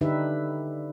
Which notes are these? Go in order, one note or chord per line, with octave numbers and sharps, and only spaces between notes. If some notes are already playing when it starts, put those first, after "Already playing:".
D3 D4 D#4 G4 B4 E5